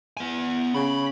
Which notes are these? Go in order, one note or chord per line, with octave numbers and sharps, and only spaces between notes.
B3 G#5
C#3 B5